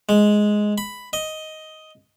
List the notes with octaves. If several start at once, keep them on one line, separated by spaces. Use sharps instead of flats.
G#3
B5
D#5